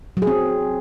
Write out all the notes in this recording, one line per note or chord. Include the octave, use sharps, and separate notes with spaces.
F#3
G#4
C4